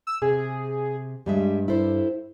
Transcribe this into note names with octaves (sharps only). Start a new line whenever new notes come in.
E6
C3 G#4
G2 G3 G#3 E5
E4 A4 C5